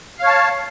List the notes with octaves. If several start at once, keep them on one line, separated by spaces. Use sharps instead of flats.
C#5 F5 A5